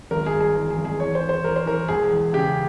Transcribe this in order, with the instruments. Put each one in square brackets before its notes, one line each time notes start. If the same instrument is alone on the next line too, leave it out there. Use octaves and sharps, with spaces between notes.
[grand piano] G#1 A#4
G#4
G2
G#4
E3 G#4
G#4
G#1
G#4
E2 C#5
C5
E3
C5
E2 A#4
C5
E3 A#4
E1 G#4
E2
C#3 G4